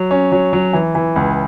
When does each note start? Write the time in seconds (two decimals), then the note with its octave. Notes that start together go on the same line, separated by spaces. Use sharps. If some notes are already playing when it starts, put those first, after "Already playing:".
Already playing: F#3
0.11 C#4
0.32 F#3
0.53 F#3
0.73 E3
0.95 E3
1.16 C#2